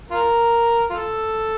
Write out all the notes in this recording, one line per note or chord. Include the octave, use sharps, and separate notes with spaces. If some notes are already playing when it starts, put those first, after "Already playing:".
F4 A#4
F4 A4